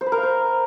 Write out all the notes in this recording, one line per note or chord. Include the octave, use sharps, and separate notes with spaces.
C5
B4
A#4
F5
C5